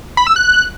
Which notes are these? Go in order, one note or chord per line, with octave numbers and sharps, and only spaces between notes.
B5
E6
F#6